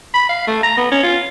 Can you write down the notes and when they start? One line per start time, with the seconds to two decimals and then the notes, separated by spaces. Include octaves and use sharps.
0.14 B5
0.29 F5
0.47 A3
0.63 A#5
0.77 B3
0.92 C#4
1.04 F4